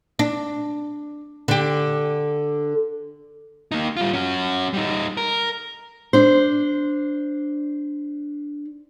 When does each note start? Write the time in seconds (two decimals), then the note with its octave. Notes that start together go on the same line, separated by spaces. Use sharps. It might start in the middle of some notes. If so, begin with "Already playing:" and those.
0.19 D4
1.48 D3 G4
3.72 A#3 D#4
3.97 G3 F4
4.13 C#4 F#4
4.73 G3 D#4
5.17 A#4
6.13 D4 C5